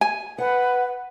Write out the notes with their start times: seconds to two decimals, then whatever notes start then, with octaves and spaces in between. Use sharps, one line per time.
0.01 G#5
0.38 B4 F#5